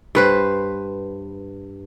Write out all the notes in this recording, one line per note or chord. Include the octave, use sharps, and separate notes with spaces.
G2 B4 C5